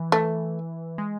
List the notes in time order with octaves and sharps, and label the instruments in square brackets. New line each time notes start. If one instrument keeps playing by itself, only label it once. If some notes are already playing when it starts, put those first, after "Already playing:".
Already playing: [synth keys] E3
[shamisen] A3
[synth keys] G#3